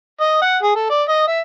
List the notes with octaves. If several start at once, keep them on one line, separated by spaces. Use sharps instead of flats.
D#5
F#5
G#4
A4
D5
D#5
E5